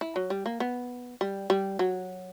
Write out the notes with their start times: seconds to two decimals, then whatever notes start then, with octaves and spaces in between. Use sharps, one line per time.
0.01 E4
0.16 F#3
0.30 G3
0.46 A#3
0.60 B3
1.21 G3
1.50 G3
1.79 F#3